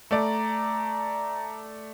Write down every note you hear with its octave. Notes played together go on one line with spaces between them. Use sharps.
A3 D5 A#5